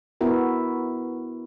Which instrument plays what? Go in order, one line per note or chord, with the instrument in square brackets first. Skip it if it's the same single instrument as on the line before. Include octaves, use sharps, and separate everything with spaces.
[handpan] B3 E4 F#4 A#4